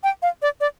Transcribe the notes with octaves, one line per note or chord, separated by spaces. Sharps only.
G5
F5
D5
D5